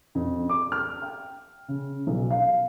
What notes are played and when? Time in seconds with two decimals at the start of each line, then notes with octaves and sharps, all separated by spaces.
0.15 F2
0.49 D6
0.72 F6
1.02 G5
1.68 C#3
2.07 B1
2.31 F5